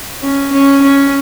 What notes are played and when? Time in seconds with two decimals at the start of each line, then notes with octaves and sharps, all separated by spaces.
0.22 C#4
0.52 C#4
0.82 C#4